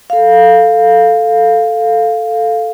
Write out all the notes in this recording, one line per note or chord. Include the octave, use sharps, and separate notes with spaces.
A4 F5